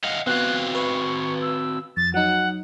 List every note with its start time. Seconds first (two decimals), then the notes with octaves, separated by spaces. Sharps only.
0.04 D#5 F5 F#5
0.27 B3 C4 F#4 F5 F#6
0.75 B4 C#6
1.42 E6
1.97 F2 A6
2.14 F#3 D#4 F#5